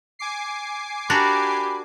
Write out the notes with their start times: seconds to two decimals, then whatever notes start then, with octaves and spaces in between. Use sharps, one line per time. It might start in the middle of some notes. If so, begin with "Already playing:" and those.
0.19 G#5 D6 C7
1.10 D4 F#4 G4 A#4 B5